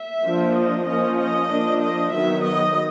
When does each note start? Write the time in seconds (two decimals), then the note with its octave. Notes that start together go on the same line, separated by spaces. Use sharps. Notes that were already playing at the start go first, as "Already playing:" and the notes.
Already playing: E5
0.23 F3 A#3 D4
0.55 D#5
0.86 F3 A#3 C#4 D#5
1.19 D#5
1.50 F3 A#3 D4
1.82 D#5
2.13 D#3 F#3 B3 E5
2.45 D#5